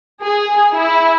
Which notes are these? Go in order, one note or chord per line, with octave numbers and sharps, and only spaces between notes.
G#4
E4